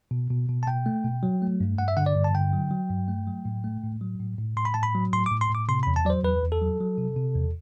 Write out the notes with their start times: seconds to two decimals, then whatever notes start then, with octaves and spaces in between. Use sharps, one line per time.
0.11 B2
0.30 B2
0.49 B2
0.63 A5
0.67 B2 G5
0.86 A3
1.04 B2
1.23 F#3
1.42 A3
1.61 G2
1.78 G2 F#5
1.88 E5
1.97 D3 F#5
2.06 D5
2.16 G2
2.24 A5
2.34 D3 G5
2.53 F#3
2.71 F#3
2.90 G2
3.08 A3
3.27 F#3
3.45 A2
3.64 A3
3.83 A2
4.01 F#3
4.20 A2
4.39 A2
4.57 A2 C6
4.65 B5
4.74 A2 A5
4.83 B5
4.95 F#3
5.13 A2 C6
5.26 D6
5.31 A2
5.41 C6
5.50 A2 D6
5.69 C3 C6
5.83 E2 B5
5.96 A5
6.05 F#3 D5
6.10 C5
6.24 E2 B4
6.42 E2
6.52 A4
6.61 F#3
6.80 F#3
6.98 C3
7.17 C3
7.36 E2